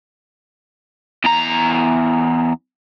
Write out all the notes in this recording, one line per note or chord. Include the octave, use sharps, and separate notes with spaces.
E2 A#5